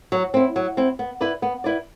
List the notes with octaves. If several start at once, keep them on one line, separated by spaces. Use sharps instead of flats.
F#3
C4 E4
F#3
C4 E4
B3
E4 B4 D5
B3
E4 B4 D5